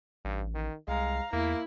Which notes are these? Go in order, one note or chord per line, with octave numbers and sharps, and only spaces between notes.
A1 G2
D#3
C2 G#3 F5 A#5
E2 A#3 E4